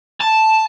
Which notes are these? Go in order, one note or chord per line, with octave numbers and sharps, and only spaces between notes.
A5